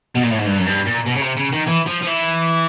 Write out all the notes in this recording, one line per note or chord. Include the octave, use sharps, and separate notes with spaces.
B2
A#2
A2
G#2
G2
F#2
G2
A#2
B2
C#3
C3
C#3
D#3
E3
F3
F3
E3